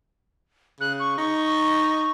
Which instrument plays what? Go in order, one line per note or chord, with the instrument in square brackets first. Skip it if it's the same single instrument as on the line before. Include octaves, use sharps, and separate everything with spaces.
[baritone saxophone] C#3 [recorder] F#6
[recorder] C#6
[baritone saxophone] D#4 [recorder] C#6